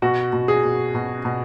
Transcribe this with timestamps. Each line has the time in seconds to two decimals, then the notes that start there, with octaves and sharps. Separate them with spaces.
0.02 B2 F#4
0.33 B2
0.48 G#4
0.64 B2
0.95 B2
1.25 B2